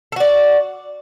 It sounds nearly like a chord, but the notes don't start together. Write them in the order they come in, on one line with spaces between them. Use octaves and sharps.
A4 F#4 D5